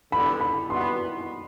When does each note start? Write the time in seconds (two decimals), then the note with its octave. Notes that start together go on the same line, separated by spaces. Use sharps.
0.12 E2 D3 G3 B3 B5
0.40 B5
0.69 E3 G3 B3 F#4 C6